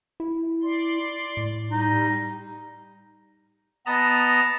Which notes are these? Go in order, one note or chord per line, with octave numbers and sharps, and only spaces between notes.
E4
D5 C6
A2
G3 D#4
B3 D#5 A5 A#5